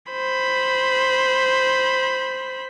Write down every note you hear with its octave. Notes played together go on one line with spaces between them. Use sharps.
C5 B5